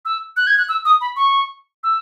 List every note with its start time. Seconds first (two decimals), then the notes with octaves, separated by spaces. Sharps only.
0.05 E6
0.37 F#6
0.47 G#6
0.58 F#6
0.69 E6
0.85 D#6
1.01 B5
1.16 C#6
1.84 E6